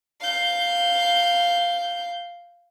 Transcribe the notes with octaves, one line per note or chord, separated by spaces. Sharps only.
F5 G6